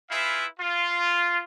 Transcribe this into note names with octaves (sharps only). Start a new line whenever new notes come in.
E4 F4 G#4 B4 E5 F5
F4